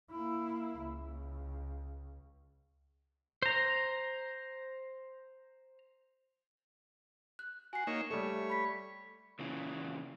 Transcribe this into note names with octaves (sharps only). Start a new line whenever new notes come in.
A#3 E4
C#2
C5 A#5
F#6
F#4 G#5 C7
A#3 D#4 C#5 E7
G3 A3 C#5
B5 B6
A#2 C#3 E3